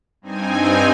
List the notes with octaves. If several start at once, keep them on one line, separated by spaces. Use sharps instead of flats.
G2 C4 D#4 G#5